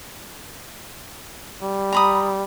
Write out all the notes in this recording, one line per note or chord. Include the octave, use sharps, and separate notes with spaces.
G3
A#5 B5 D#6